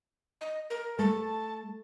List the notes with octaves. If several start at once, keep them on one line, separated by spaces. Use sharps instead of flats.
D#5
A#4
A3 A5